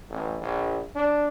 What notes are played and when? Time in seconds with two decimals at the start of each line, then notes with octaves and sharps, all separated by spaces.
0.10 A1
0.41 A#1
0.95 D4